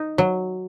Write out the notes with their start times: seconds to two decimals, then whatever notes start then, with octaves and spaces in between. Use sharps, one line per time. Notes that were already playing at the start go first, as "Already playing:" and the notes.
Already playing: D#4
0.18 F#3